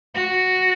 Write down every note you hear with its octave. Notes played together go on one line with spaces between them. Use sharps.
F#4